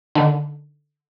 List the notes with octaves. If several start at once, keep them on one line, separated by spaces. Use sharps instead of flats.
D3 D#3